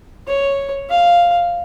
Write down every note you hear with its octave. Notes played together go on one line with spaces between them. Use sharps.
C#5
F5